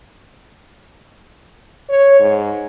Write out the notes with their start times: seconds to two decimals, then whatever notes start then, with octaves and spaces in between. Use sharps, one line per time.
1.89 C#5
2.20 G#2